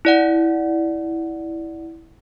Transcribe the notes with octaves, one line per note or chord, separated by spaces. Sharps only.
E4 D5 F#5